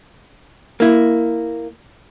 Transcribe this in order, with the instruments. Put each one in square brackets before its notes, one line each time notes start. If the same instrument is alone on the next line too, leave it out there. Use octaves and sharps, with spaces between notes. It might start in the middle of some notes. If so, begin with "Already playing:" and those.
[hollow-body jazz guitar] A#3 E4